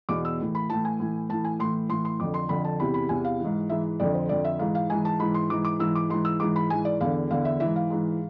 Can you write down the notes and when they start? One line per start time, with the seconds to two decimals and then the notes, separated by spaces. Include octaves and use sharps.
0.09 E2 B2 D6
0.25 E6
0.40 A2 E3
0.55 B5
0.69 A2 E3 A5
0.85 G#5
1.00 A2 E3
1.29 A2 E3 A5
1.45 G#5
1.59 A2 E3 C6
1.89 A2 E3 C6
2.05 C6
2.20 F2 D3 D6
2.34 C6
2.49 F2 D3 B5
2.64 A5
2.80 E2 C3 E3 B5
2.94 B5
3.09 E2 C3 E3 G#5
3.25 F5
3.40 G#2 E3
3.69 G#2 E3 E5
4.00 F2 D3 D5
4.14 C5
4.29 F2 D3 D5
4.45 E5
4.59 G#2 E3 F5
4.75 F5
4.90 G#2 E3 G#5
5.05 A5
5.19 G#2 E3 B5
5.34 C6
5.50 G#2 E3 D6
5.65 D6
5.79 G#2 E3 E6
5.95 D6
6.10 G#2 E3 C6
6.25 E6
6.40 G#2 E3 D6
6.56 B5
6.70 G#2 E3 G#5
6.85 D5
7.01 E2 D3 F5
7.31 E2 D3 F5
7.45 E5
7.60 G#2 E3 E5
7.76 F5
7.90 G#2 E3